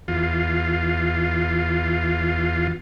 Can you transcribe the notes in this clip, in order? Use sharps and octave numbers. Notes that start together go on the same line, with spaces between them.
E2 F4